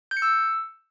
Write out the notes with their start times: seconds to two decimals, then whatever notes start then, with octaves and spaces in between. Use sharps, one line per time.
0.11 G6
0.17 C#7
0.22 E6